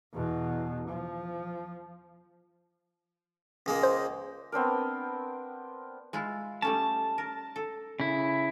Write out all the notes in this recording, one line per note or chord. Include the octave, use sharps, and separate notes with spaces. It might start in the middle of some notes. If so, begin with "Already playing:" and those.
E2 B2
F3
C#2 G#3 A#3
C5
B3 C4 D4 A#4
G#3 E4 F4
G3 A3 C#4 A5
A#4
A4
C#3 E4